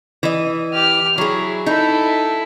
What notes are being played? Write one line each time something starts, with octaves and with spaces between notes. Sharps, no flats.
E3 D#5
G4 F6
F#3 E4 G#4
D#4 E4 A4